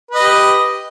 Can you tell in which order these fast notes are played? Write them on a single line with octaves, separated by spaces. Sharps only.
B4 D#5 G4